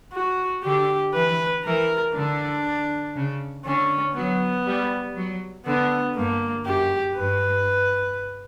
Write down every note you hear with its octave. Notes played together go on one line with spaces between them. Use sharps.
F#4
D3 G4
E3 B4
E3 A#4
D3 D4
C#3
D3 C#4
F#3 B3
G3
F#3
D3 B3
G2 A#3
F#2 G4
G2 B4